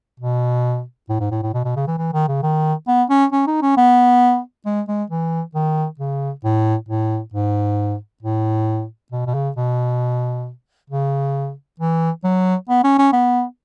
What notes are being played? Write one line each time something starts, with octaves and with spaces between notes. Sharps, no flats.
B2
A2
G#2
A2
A2
B2
B2
C#3
E3
E3
D#3
C#3
D#3
B3
C#4
C#4
D#4
C#4
B3
G#3
G#3
E3
D#3
C#3
A2
A2
G#2
A2
B2
B2
C#3
B2
C#3
E3
F#3
B3
C#4
C#4
B3